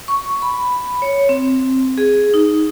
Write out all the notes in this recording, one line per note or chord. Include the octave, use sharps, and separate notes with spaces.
C#6
B5
C#5
C4
G#4
D#4